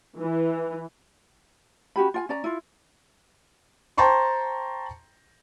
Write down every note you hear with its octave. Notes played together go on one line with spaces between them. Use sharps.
E3
C#4 F#4 G4 B5
F4 G5 G#5
C#4 D5 A#5
E4 F4
C5 G5 A5 A#5 C6 C#6